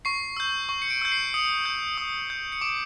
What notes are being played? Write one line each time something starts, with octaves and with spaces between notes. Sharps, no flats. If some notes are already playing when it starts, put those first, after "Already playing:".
C#6 C7
E6 G6
C#6
C#7
D7
E6 G6
C7
D#6 C#7
G6
D#6
G6
C#7
D6 D7